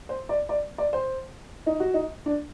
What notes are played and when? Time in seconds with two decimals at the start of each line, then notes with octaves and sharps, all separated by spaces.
0.09 C5
0.29 D5
0.49 D5
0.78 D5
0.93 C5
1.66 D#4
1.80 F#4
1.94 D#4
2.26 D4